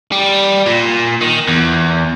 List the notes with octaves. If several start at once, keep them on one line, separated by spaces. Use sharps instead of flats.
G3
A#2
D#3
E2